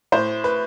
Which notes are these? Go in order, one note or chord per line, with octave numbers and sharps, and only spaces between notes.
A2 C5
B4